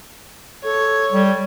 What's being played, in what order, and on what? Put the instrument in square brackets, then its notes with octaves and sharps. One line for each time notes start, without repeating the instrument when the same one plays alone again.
[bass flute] A4 [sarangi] C#5
[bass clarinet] G3